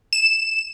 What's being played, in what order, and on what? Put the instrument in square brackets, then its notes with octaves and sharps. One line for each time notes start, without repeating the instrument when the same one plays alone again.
[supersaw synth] E7